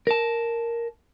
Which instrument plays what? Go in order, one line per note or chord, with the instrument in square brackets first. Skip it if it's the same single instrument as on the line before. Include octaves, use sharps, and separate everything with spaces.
[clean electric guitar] A#4 A5